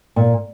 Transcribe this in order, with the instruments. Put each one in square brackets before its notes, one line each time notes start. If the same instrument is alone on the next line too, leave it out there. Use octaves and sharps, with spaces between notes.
[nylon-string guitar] A#2